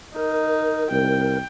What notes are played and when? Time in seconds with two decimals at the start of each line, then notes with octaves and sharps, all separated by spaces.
0.16 D#4 A#4
0.91 C2 G5